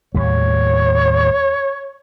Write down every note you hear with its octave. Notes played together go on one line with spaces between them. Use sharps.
D#2 A2 G3 C#5